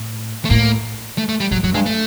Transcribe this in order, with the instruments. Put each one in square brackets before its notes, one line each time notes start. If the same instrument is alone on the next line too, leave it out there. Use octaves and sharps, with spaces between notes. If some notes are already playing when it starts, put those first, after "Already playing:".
Already playing: [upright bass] A2
[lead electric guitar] A3
[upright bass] A2 [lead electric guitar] A#3
[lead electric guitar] A3
A3
G3
[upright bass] A2 [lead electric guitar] F#3
[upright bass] G#2 [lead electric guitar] F#3
[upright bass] F#2
[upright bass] G2 [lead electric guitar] G#3
[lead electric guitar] A3